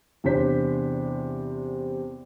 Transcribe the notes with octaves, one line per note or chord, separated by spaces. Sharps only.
E2 C3 D4 C5 B6